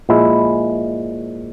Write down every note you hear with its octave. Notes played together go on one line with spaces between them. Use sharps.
A#2 F3 G#3 E4